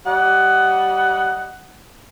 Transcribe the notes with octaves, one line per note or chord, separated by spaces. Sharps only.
G3 D#5 F#5